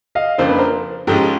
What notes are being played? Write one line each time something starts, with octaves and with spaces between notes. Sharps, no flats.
D#5 F5
F2 C#3 F3 A#3 D4 C5
B4
A#4 C5
G#2 F3 G#3 C#4 F4 G4 A4